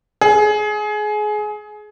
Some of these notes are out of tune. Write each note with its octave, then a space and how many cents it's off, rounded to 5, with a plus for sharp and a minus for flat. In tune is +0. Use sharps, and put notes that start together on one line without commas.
G#4 +25